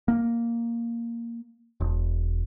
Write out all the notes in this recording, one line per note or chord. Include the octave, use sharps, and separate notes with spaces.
A#3
E1